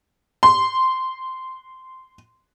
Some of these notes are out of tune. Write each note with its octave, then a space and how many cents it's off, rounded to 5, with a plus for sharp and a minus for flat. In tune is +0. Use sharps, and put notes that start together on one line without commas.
C6 -10